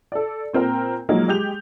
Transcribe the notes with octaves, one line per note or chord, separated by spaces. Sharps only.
A4 D5
A#2 C4 A#4 G5 A#5
F3 F#3 G#3 A#3 D#4
G#3 G4 G6 F7